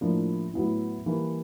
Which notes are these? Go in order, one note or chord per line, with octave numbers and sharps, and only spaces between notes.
A2 F3 A#3 D4
A2 F#3 B3 E4
E3 G3 A#3